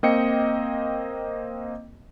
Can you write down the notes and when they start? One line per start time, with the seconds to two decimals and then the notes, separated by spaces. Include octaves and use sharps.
0.03 A#3 C4 D#5 G5 C#7